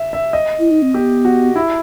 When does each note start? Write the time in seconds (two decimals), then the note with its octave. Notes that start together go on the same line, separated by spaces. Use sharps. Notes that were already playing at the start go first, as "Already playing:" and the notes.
Already playing: E5
0.13 E5
0.33 D#5
0.59 E4
0.71 D#4
0.82 C4
0.94 B3 G4
1.25 F#4
1.56 E4